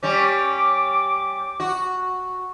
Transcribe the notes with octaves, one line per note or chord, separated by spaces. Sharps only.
G3 C#4 D6
F#4